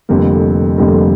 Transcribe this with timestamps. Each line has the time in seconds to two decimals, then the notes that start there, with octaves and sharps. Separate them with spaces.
0.09 F1 F2 D3 G3 A#3
0.78 F1 F2 D3 G3 A#3